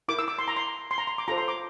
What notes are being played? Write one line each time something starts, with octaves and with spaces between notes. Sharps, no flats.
E4 A#4 D6
E6
D6
C6
A#5
C6
C6
A#5
C6
D6
F4 A4 C5 A#5
C6
D6